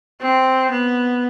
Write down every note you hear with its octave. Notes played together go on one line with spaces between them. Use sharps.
C4
B3